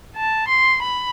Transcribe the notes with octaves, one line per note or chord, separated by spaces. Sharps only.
A5
C6
B5